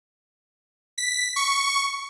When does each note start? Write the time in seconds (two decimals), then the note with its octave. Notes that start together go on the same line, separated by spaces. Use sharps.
0.98 B6
1.36 C#6